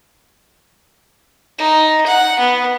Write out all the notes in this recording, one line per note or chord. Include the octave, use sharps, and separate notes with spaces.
D#4
F#5
B3